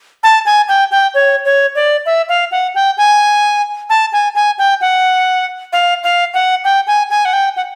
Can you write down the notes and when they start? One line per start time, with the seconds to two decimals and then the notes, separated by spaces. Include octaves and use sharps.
0.23 A5
0.46 G#5
0.68 G5
0.91 G5
1.14 C#5
1.45 C#5
1.75 D5
2.06 E5
2.29 F5
2.52 F#5
2.75 G5
2.98 G#5
3.90 A5
4.13 G#5
4.35 G#5
4.58 G5
4.81 F#5
5.73 F5
6.03 F5
6.34 F#5
6.64 G5
6.87 G#5
7.10 G#5
7.25 F#5
7.33 G5
7.56 F#5